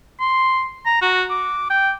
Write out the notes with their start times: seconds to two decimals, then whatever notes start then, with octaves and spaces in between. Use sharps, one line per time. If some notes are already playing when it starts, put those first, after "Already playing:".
0.20 C6
0.86 A#5
1.02 F#4
1.30 D6
1.70 G5